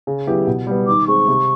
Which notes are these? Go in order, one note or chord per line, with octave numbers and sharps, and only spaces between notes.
C#3
F#3 B3 E4 G4
B2
G3 B3
D#3 D6
G#3 C4 C#6
C3